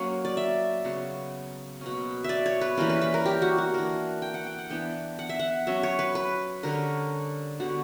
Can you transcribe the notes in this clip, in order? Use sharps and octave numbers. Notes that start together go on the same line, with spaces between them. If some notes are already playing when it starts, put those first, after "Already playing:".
Already playing: F#3 A#3 C#4
D5
E5
C#3 F#3 B3
B2 A#3 C#4
D5 E5
C#5
B4
E3 G3 A#3 C#4 A#4
B4
B4
A#4
G4
F#4
F#4
E3 A#3 D4 A#4
G5
F#5
G5
F#5
E3 B3 D4 G5
F#5
E5
F#5
F#3 C#4 E5
C#5
B4
B4
D3 G3 C#4 A#4
D3 G3 B3 F#4